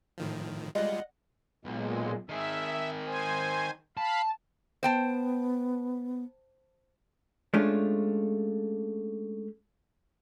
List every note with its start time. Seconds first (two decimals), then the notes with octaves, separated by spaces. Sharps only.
0.18 A2 D#3 F3
0.75 G3 G#3 F4 D#5 F#5
1.65 B1 A#2 G#3
2.29 D#3 G#4 E5
3.05 C5 G#5
3.97 F5 A5 B5
4.83 B3 C5 G5 A5
7.54 G#3 A3 C#4 D4 F4